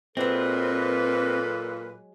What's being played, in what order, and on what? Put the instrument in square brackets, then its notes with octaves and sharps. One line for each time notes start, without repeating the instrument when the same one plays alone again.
[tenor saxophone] A#2 [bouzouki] F#3 G#3 [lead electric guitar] C4 [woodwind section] A4 B4